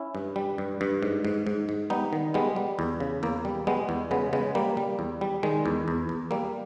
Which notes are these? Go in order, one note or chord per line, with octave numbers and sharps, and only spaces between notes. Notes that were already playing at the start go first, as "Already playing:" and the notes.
Already playing: C#4 E4
G2
G3
G2
G2
G#2
G#2
G#2
G#2
G3 B3 D#4
D#3
G3 G#3 B3
G3
E2
C#3
E2 A#3
G3
G3 G#3 B3
E2
C#3 G#3 B3
C#3 G#3 B3
G3 A#3
G3
E2
G3
D#3 G#3
E2
E2
E2
G3 A#3